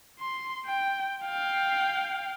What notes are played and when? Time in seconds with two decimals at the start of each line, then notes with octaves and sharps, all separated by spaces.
0.19 C6
0.66 G5
1.25 F5 G5